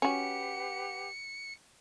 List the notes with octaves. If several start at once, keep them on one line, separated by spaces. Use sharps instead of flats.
C#4 F#4 G4 B4 F#5 C#7